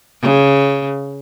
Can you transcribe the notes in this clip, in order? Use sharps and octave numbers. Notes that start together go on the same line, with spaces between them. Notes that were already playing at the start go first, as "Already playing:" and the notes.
C#3